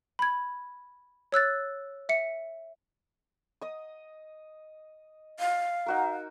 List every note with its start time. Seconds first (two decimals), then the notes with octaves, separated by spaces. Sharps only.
0.19 B5 G#6
1.32 C#5 E6 F#6 A6
2.09 E5 C#7
3.61 D#5 D#6
5.40 F5
5.86 D#4 F#4 A#4